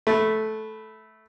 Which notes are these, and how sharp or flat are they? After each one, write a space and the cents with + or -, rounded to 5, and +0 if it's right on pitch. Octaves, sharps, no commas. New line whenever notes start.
A3 -15 B4 +0